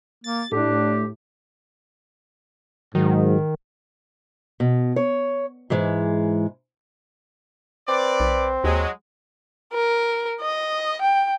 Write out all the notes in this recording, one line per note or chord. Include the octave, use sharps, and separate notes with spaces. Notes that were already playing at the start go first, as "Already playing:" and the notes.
A#3 A6
A2 D4 G4
G#2 D#3 F#3
B2
C#5
G#2 E3 G#3
C4 B4 D5
B1
D#2 F#3 G#3
A#4
D#5
G5